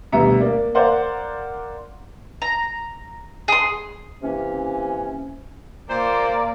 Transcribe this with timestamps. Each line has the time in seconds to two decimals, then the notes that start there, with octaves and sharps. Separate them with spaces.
0.12 D2 B2 G3 E5 A#5 C#7
0.40 A#3 D5
0.75 A#4 C5 D5 F5 F#5 C6
2.42 A#5
3.48 G#4 C6
4.22 C3 E3 A#3 C#4
5.90 A#2 A#3 C5 D5